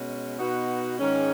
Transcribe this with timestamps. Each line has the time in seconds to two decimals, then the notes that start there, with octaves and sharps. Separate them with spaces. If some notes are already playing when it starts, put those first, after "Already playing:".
Already playing: B2 G#3 C#4
0.39 B2 B3 D#4 F#4
0.98 G#2 D#3 G#3 C#4